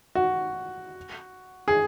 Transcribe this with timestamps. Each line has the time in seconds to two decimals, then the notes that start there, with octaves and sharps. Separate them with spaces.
0.15 F#4
1.68 G#4